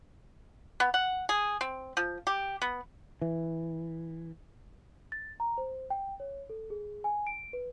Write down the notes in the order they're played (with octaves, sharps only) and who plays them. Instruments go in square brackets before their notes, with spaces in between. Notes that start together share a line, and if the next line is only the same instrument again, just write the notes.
[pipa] B3
F#5
G#4
C4
F3
G4
B3
[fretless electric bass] E3
[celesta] A6
A#5
C5
G5
C#5
A4
G#4
G#5
D7
B4